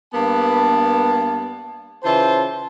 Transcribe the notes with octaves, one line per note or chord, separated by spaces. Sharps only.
G2 A#3 B3 A5
C#3 E3 F4 C5 A5